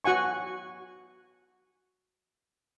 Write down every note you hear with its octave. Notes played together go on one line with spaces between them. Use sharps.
F#4 F#5 G#5 C#6